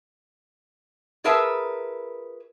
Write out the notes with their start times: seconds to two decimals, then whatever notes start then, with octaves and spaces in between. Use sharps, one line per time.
1.24 F4 G#4 A#4 B4 E5 A5